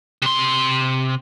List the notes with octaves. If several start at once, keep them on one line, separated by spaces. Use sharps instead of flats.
C3 C6